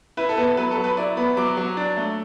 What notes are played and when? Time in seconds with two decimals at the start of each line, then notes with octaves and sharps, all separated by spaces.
0.17 E4 B4
0.29 A4
0.37 B3 B4
0.57 F#3 B4
0.71 A4
0.77 F#3
0.84 B4
0.97 E4 D5
1.17 B3 B5
1.37 F#3 D6
1.57 F#3
1.77 D4
1.97 A3